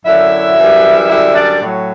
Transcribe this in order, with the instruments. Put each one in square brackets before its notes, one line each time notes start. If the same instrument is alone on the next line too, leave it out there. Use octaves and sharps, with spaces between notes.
[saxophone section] F#2 D3 F#3 E4 E5
F#2 E3 G3
F#2 D3 G3 E4 E5
D4 D5
A2 F#3